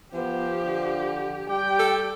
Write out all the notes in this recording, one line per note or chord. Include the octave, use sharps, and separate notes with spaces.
F3 B3 G4
D3
G3 G4 G5
A4